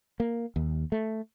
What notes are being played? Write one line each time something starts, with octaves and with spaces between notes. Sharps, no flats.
A#3
D#2
A3